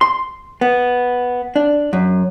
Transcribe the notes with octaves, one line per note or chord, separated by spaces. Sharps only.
C6
B3
D4
F#2